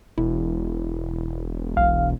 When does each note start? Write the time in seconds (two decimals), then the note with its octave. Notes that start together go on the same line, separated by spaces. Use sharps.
0.18 E1 E4
1.77 B1 F5